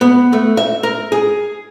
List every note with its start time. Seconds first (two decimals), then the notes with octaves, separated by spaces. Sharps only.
0.01 B3
0.33 A3
0.57 E5
0.83 A#4
1.12 G#4